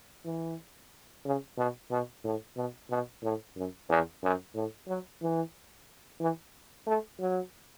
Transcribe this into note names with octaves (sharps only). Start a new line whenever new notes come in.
E3
C#3
B2
B2
A2
B2
B2
A2
F#2
E2
F#2
A2
F#3
E3
E3
A3
F#3